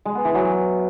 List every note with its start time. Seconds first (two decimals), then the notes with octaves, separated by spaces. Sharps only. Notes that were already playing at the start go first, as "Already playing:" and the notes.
0.05 G#3
0.15 B3
0.25 E3
0.35 F#3